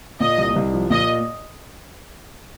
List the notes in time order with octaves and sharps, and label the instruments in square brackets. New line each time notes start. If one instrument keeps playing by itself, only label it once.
[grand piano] A#2 [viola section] D#5
[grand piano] C2
C2
F3
[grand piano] A#2 [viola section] D#5